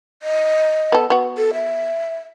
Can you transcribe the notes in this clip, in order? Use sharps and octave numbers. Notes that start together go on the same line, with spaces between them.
D#5
B3 A4
B3 F#4
A4
E5